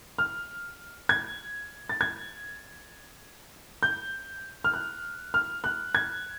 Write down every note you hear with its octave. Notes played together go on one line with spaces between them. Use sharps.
F6
G#6
A6
G#6
G6
F6
F#6
F6
F#6
G#6